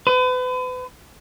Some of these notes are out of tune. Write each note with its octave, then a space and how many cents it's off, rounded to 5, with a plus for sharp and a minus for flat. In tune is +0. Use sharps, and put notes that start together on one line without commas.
B4 +40